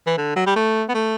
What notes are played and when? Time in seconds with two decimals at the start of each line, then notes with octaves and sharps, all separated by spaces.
0.06 E3
0.18 D3
0.36 F#3
0.47 G3
0.56 A3
0.89 B3
0.95 A3